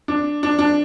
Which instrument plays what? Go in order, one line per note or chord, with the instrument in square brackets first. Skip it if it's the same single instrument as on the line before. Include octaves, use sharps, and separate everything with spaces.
[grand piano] D4
D4
D4